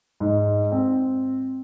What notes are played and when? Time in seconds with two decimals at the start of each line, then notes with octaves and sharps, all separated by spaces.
0.20 G#2
0.72 C4